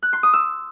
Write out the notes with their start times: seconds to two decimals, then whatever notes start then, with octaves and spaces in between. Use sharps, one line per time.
0.03 F#6
0.13 C6
0.23 D#6
0.33 E6